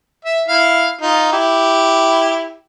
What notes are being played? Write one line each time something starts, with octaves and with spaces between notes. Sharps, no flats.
E5
E4 F5
D#4 F4
E4 G4